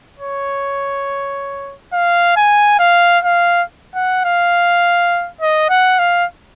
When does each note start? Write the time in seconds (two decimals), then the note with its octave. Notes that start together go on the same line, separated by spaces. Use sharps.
0.20 C#5
1.93 F5
2.37 G#5
2.79 F5
3.24 F5
3.95 F#5
4.25 F5
5.41 D#5
5.70 F#5
5.99 F5